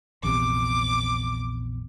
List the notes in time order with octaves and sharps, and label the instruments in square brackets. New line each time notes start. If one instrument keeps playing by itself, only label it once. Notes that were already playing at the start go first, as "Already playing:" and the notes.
[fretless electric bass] A#1 E2 C3 [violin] D6